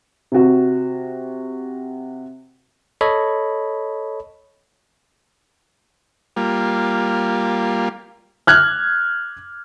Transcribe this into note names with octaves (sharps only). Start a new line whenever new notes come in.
C3 F#4
A4 C#5 D#5 B5
G3 A#3 F4
F6 F#6 G#6